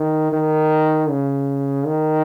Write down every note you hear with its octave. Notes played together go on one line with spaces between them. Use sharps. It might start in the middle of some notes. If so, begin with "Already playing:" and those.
Already playing: D#3
D#3
C#3
D#3